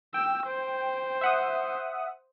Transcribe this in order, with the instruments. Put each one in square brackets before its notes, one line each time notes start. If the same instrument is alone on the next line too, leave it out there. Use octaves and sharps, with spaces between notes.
[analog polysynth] G5 [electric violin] E6
[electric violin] C5
[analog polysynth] E5 F#5 D#6